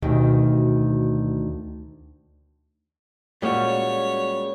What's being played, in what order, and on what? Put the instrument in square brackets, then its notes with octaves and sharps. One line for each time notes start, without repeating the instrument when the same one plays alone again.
[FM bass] D2 [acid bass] B2 [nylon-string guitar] D3 D#3 G4
[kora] A#2 C#4 G5 [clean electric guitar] G3 G#3 F#4 [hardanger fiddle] C#5